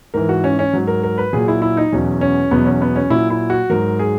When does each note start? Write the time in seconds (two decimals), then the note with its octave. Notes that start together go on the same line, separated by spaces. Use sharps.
0.14 G#2 E3 A#4
0.29 F#4
0.44 C#4
0.59 C#4
0.73 G#2 F#3
0.87 A#4
1.03 A#4
1.18 B4
1.33 A#2 F#3 G#4
1.48 E4
1.62 E4
1.77 D#4
1.92 E2 B2 F#3 C#4
2.21 C#4
2.51 E2 B2 F#3 B3
2.66 C#4
2.82 B3
2.96 C#4
3.10 A#2 F#3 E4
3.30 E4
3.50 F#4
3.70 G#2 F#3 A#4
3.99 G#4